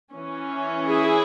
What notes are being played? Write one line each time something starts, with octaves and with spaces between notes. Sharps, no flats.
E3 C#4
E4 G#4